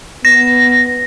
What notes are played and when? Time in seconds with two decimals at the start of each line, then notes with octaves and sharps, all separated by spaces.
0.25 B3 A#6